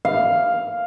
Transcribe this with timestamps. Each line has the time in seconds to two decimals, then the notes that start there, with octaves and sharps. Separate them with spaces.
0.05 F5